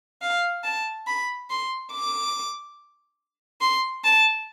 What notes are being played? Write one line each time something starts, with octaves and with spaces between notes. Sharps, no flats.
F5
A5
B5
C6
D6
C6
A5